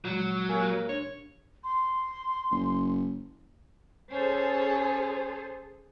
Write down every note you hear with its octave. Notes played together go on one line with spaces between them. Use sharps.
A#2 E3 F#3 G#3
A#3 G4 G#5
D4 C#5
C6
F#1
C#4 G#4 A4 C5